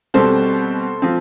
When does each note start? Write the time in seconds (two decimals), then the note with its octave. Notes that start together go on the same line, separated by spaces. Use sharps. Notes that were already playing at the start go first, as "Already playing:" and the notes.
0.14 B2 G3 C4 A4 C5
1.02 F3 C4